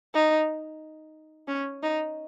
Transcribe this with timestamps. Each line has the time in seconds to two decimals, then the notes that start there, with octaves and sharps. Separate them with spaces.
0.14 D#4
1.48 C#4
1.83 D#4